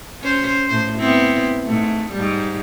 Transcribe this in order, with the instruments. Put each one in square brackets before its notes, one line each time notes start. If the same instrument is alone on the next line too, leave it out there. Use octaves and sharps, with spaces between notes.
[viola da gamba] C#4 C5
A2 C5
B3 C4 E4
G#2 A3
G#2 G3